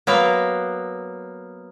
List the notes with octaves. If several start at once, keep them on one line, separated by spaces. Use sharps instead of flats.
F#3 A#3 B3 A#4